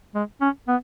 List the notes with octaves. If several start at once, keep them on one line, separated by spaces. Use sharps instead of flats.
G#3
C#4
B3